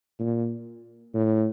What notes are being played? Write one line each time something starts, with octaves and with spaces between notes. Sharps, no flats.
A#2
A2